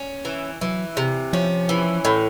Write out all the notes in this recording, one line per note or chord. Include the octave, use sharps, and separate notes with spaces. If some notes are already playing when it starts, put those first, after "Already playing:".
Already playing: C#4
E3
E3 F#3
C3
F3 C#4
E3
A2